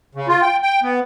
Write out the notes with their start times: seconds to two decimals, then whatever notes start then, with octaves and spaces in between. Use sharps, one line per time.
0.15 C#3
0.28 F4
0.42 G5
0.63 G5
0.83 B3